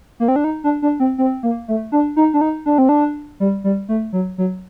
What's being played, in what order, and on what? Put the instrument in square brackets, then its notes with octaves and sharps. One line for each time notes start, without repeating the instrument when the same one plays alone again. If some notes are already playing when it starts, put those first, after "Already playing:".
[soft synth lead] A#3
C4
D4
D#4
D4
D4
C4
C4
A#3
A3
D4
D#4
D4
D#4
D4
C4
D4
G3
G3
A3
F#3
F#3